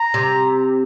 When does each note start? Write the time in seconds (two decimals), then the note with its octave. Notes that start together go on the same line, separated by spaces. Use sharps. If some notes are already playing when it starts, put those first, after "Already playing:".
Already playing: A#5
0.14 C3